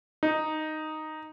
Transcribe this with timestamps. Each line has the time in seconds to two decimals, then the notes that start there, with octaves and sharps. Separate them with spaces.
0.23 D#4